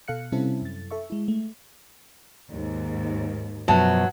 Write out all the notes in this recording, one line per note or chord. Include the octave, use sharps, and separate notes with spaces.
B2 A4 F5 F#6 C#7
C3 G3 C4 C#4 E4 A4
F#2 A6
A4 E5 C#6
G#3 E4
A3
D#2 G#2
F#2 B2 F3 F#3 A5